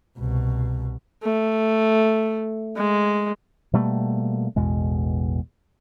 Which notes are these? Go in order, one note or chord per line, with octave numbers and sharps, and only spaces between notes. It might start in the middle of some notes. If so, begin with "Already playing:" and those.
C2 B2
A3
G#3
B2 G3 A3 A#3
A1 E2 B2 G#3